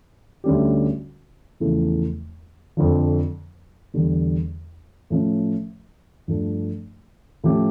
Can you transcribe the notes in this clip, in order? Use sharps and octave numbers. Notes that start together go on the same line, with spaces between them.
D2 D3 G3 C#4 G4
E2 C#3 F3 A3 E4
F2 D3 F3
E2 D3 G3
A2 F3 C#4
G2 F3 A3 D4
A2 F3 C#4 G4